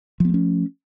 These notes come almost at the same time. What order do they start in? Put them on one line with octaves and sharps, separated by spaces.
F3 B3 A3 C#4